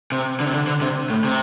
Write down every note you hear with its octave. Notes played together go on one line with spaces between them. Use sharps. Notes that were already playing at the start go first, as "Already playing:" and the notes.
C3
D3
C3
D3
D3
C3
A2
C3